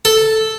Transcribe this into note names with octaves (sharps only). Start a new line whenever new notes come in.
A4